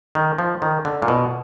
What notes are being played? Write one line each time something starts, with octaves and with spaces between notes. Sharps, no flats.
D#3
F3
D#3
D3
A#2
B2